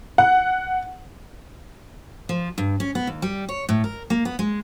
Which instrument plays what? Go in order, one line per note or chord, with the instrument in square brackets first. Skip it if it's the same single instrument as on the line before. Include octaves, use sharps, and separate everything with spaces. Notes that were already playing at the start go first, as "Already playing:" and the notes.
[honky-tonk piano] F#5
[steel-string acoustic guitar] F3
G2
C#4
B3
D#2
G3
C#5
A2
A#4
A#3
B3
G#3